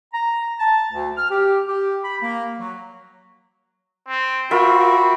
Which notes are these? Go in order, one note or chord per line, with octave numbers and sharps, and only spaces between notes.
A#5
A5
D2
F6
G4
G4
B5
A#3
F#3
C4
C4 F4 F#4 A#4 E5 B5